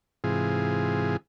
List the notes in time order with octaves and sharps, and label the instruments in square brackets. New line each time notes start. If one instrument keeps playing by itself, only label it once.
[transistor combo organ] G#2 C3 E3 F4 G#4